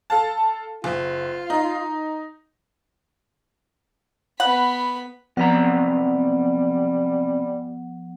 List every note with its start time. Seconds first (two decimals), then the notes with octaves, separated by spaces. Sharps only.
0.10 A4 F5 A5
0.84 F#1 F4
1.50 D#4
4.40 B3 F#5 B5
5.37 B1 C3 F3 G3 B3 F#5 A#5